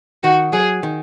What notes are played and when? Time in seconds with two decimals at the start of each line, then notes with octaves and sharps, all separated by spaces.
0.23 D#3 F#4
0.53 F#3 G#4
0.83 D#3